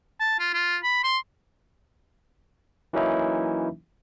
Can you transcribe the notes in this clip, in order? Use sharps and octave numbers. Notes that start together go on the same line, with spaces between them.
A5
F4
F4
B5
C6
E3 F#3 A#3 C#4 D#4 E4